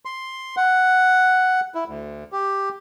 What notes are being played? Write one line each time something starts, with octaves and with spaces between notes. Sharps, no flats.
C6
F#5
E4
D2
G4